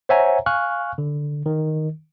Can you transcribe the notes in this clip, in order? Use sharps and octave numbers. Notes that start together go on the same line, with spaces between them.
C5 C#5 E5 F#5 G#5 A#5
F5 G#5 C#6 F6 F#6
D3
D#3